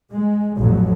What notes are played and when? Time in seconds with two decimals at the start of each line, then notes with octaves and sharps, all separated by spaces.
0.13 G#3
0.58 A1 F2 F#3